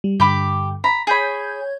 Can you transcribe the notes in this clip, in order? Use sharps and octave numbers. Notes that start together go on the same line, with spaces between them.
G3
G2 D3 G4 B5 D6
A#5 B5
G#4 C#5 B5 G6 G#6